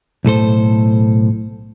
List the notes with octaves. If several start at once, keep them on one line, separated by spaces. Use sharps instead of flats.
B1 A2 A4 C5